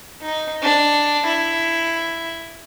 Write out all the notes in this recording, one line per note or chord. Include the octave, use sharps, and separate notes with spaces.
D#4
D4
E4